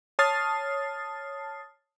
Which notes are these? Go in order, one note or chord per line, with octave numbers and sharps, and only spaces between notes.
C#5 A5 D#6 F6 A6 C7